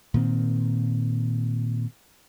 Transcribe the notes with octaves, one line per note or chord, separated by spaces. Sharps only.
A#2 D#3 C4